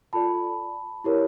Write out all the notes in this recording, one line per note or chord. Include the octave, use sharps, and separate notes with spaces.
F4 A4 D5 A5 B5
E4 G4 A#4 C#5